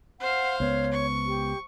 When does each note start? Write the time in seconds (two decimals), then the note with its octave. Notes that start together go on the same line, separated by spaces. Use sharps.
0.20 C5 F5 F#5
0.60 C#2 B3 C#5
0.92 C#6
1.27 G4